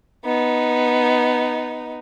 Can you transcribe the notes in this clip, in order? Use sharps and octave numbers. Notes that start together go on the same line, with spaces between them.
B3 D#4